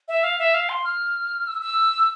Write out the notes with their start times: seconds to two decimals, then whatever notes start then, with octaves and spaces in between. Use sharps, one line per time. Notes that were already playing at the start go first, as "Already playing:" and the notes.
0.08 E5
0.24 F5
0.39 E5
0.54 F5
0.69 C6
0.84 F6
1.47 E6
1.62 E6